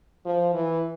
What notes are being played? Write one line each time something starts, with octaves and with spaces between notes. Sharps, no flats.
F3
E3